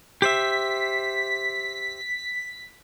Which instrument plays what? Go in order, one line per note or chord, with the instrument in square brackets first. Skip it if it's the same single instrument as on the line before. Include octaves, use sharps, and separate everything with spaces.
[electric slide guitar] G4 C5 E5 [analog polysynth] B6